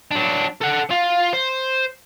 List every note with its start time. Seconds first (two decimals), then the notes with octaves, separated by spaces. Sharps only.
0.11 F#3 D4
0.61 A4 F#5
0.90 F4
1.33 C5